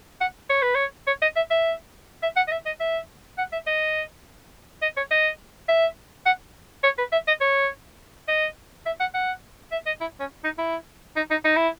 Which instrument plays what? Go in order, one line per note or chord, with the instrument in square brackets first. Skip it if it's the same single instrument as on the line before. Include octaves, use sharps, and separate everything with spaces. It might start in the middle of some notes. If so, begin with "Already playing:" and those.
[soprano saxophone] F#5
C#5
B4
C#5
C#5
D#5
E5
E5
E5
F#5
D#5
E5
D#5
E5
F#5
E5
D#5
D#5
C#5
D#5
E5
F#5
C#5
B4
E5
D#5
C#5
D#5
E5
F#5
F#5
E5
D#5
E4
C#4
D#4
E4
D#4
D#4
D#4
E4